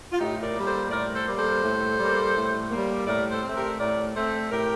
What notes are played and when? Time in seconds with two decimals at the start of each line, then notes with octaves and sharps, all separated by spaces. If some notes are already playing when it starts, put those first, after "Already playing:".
0.12 F4
0.18 A2 D#4 G4
0.42 A#4 D5
0.55 G3 A#3
0.66 A4 C5
0.91 A2 A#4 D5
1.14 A4 C5
1.27 G3 A#3
1.39 A4 C5
1.64 A2
1.99 G3 A#3
2.36 A2
2.71 G3 A#3
3.07 A2 A#4 D5
3.31 A4 C5
3.43 A3 C4
3.56 G4 A#4
3.79 A2 A#4 D5
4.15 A3 C4 A4 C5
4.51 A2 G4 A#4